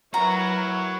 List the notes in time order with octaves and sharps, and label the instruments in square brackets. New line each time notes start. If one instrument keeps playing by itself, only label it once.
[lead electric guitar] F#3 F#4 [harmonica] E4 C#5 [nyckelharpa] A#4 B4 [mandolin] A#5